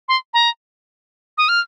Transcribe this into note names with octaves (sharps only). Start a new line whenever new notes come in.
C6
A#5
D#6
F6